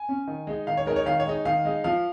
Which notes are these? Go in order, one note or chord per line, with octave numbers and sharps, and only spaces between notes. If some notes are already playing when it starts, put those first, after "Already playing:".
Already playing: G#5
C#4
D#3
G#3 D#4
D#3 F5
C#5
G#3 D#4 A#4
C#5
D#3 F5
C#5
G#3 D#4
D#3 F5
G#3 D#4
F3 F5